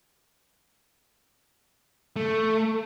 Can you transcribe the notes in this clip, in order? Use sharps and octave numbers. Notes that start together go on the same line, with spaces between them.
A3